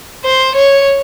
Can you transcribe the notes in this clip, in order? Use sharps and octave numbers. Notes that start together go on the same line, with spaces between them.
C5
C#5